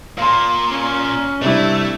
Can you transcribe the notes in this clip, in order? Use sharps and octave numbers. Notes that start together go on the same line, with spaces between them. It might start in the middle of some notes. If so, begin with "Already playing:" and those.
A#2 F5 C6
C#4
C3 G3 A3 D4 E4